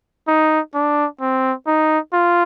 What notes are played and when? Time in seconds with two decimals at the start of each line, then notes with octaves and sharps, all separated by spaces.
0.28 D#4
0.74 D4
1.21 C4
1.67 D#4
2.13 F4